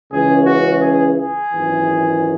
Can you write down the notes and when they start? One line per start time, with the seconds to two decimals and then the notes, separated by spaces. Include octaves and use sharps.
0.10 C#2 C#3 E3 G#4
0.46 F#4
0.81 G#4
1.17 G#4
1.52 G#1 F#2 E3